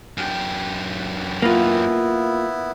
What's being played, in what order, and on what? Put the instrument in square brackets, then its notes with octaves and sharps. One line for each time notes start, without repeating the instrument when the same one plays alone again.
[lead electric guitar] F#2 G4
[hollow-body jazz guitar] A#3 F4 [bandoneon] B3 E4